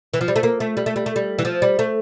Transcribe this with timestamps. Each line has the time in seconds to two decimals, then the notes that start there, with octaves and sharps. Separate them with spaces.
0.14 E3
0.21 F3
0.28 G3
0.36 A3
0.43 A#3
0.60 A3
0.77 G3
0.86 A3
0.96 G3
1.06 A3
1.16 G3
1.39 E3
1.45 F3
1.62 G3
1.79 A3